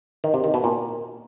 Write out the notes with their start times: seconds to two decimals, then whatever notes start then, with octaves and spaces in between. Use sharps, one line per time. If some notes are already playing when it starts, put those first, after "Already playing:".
0.24 D#3
0.34 C3
0.44 D#3
0.54 B2
0.64 A#2